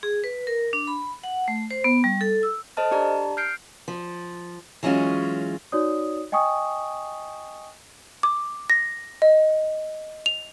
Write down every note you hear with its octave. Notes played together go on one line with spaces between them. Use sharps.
G#4
B4
A#4
D4
B5
F#5
A3
C5
B3
G3
A4
E6
A4 C5 D#5 A5 F6
D4 G4 D5 A5 A#5
F6 G6 C7 D7
F3
E3 F#3 G#3 C#4 F4
D#4 F#4 C#5 D5 D#6
D#5 G5 G#5 C#6 D#6
D6
A#6
D#5
F7